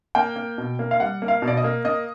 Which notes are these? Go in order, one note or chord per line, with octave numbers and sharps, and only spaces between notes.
A#3 G5
A#3
B2
A#3
F5
G3 F#5
A#3
F5
B2
D5
D#5
A#3
A#3 D#5